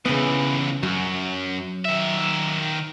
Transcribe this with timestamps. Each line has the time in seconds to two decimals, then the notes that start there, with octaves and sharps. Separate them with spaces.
0.06 C#2 C#3 E3 B3
0.83 F#2 F#3
1.85 D#3 E5